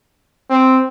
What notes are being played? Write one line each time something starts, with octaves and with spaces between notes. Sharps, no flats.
C4